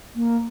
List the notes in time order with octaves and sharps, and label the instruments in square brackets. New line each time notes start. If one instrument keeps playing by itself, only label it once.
[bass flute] A#3